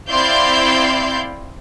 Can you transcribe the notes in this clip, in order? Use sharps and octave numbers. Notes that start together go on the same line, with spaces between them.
C4 E4 D5 F5 C6 G6